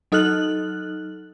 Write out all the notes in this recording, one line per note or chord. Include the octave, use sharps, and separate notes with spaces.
F#3 D#4 A4 F6 F#6 F#7